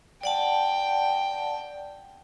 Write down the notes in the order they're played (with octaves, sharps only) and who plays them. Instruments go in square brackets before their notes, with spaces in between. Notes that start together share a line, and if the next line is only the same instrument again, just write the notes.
[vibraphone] D5 F#5 A5 [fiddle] G5